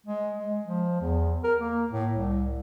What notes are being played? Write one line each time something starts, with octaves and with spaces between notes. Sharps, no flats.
G#3
G#3
F3
E2
A#4
A#3
A2
C2